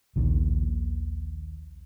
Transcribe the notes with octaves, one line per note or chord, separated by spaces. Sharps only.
A#1 D#2 A#2 D#3